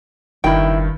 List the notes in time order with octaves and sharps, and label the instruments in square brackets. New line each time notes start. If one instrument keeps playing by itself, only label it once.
[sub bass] F#1 [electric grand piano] G2 D#3 [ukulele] E4 G5